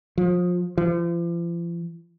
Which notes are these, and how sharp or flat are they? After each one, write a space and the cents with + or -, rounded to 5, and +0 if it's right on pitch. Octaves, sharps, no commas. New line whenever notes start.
F3 +30
F3 -40